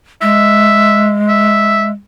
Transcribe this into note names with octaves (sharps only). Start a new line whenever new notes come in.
G#3 E5
E5